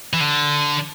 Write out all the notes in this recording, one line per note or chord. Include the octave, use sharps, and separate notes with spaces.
E3
D3